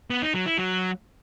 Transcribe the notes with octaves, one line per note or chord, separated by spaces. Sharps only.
B3
D#4
F#3
E4
F#3